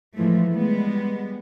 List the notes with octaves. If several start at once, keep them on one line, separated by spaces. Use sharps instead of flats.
A2 E3 F3 G#3 A3
G3 G#3 B3